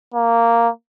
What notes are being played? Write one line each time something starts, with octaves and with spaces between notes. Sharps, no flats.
A#3